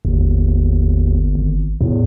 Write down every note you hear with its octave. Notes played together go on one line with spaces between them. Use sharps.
G1 D#2
G#1
E2 A2